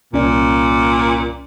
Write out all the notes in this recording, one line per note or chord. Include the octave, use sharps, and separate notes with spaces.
C2 A#2 C#4 D5